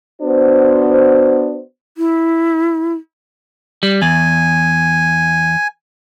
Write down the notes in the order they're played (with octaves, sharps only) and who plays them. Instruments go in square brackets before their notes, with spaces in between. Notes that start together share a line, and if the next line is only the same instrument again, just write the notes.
[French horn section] B3 D4 F#4 C5
[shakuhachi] E4
[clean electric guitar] G3
[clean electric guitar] E2 [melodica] G#5